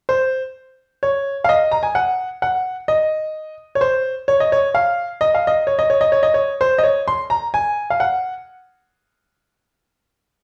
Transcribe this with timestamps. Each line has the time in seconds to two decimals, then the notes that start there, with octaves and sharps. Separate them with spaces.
0.09 C5
1.03 C#5
1.44 F5
1.49 D#5
1.71 A#5
1.83 G#5
1.95 F#5
2.42 F#5
2.88 D#5
3.75 C#5
3.81 C5
4.28 C#5
4.40 D#5
4.52 C#5
4.75 F5
5.21 D#5
5.35 F5
5.47 D#5
5.67 C#5
5.79 D#5
5.90 C#5
6.01 D#5
6.12 C#5
6.23 D#5
6.34 C#5
6.61 C5
6.78 D#5
6.84 C#5
7.08 C6
7.30 A#5
7.54 G#5
7.90 F5
8.00 F#5